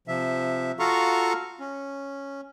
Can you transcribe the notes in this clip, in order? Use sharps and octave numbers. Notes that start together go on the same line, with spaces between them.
C3 F3 E5
F4 F#4 A4 F5 A#5 C#6
C#4